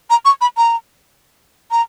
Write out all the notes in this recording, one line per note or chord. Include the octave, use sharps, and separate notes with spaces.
A#5
C#6
B5
A#5
A#5